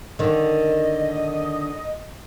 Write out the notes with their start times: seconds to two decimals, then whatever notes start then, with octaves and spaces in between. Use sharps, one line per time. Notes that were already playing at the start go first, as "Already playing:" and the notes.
0.19 D3 D#3 D#5